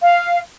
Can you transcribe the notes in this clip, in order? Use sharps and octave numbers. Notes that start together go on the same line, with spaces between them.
F5